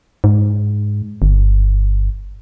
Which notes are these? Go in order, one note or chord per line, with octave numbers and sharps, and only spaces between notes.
G#2
G1